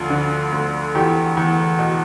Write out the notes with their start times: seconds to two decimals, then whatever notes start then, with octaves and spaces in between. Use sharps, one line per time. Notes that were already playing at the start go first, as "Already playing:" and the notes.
Already playing: D2 F3 F4
0.10 D3
0.52 D2
0.95 E2 G4
1.37 E2
1.79 B2